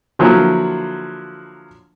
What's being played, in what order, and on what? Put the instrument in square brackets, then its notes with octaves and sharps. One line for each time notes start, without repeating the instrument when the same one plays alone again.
[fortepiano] D3 F3 F#3 A#3 E4